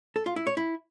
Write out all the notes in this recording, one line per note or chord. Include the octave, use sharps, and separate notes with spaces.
A4
F4
E4
C#5
E4